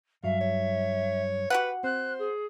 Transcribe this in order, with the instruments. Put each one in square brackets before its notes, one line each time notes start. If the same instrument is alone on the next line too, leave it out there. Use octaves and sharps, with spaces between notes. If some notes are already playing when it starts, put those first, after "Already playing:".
[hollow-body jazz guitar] G2 F#3 [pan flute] E5 [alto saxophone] F5
[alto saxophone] C#5
[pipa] F#4 G4 F#5 [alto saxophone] B4
[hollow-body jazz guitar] C4 [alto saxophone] C5 [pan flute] F#6
[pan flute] G#4